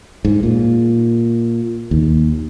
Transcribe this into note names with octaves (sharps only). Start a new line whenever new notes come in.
G#2
A#2
D#2